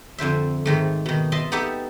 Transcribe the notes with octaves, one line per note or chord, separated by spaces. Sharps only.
F2 D3 C5 E5
G#2 D#3 A3
B2 D#3
D#5 E5 A5 C6
B3 D#4 G4 A4 E5